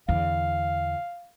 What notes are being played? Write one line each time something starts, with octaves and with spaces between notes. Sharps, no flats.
E2 D3 F5